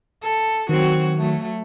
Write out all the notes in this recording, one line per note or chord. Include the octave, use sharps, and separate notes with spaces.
A4
D#3 F#3 C4 F#4
F#3 A3